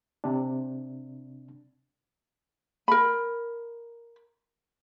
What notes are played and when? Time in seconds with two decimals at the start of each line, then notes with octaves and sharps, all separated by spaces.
0.24 C3 D4
2.88 A#4 B5